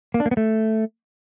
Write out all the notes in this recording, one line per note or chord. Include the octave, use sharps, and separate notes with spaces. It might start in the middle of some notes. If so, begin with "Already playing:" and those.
A#3
D4
A#3
B3
A3